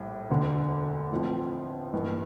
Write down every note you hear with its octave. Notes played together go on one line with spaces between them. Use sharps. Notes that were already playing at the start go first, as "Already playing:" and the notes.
Already playing: A#1 A2 G3
E1 D2 D3
A1 A2 F3 C4
A1 G2 E3 A#3